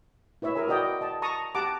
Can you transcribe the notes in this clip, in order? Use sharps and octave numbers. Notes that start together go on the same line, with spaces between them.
E4 B4 C#5 E5
G#4 A#4 G#5
F#4 B4 D5 D#5 G5
D#5 A5
A5 A#5 C#6 D#6
G4 F#5 A5 A#5 D6